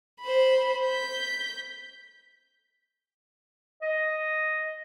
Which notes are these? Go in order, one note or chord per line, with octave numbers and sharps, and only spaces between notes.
C5 B5
G6 B6
D#5